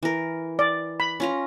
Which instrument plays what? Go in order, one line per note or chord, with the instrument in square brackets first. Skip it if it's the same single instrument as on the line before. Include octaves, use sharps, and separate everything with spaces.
[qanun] E3 A#4
[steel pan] D5
B5
[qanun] C#4 F4 A#5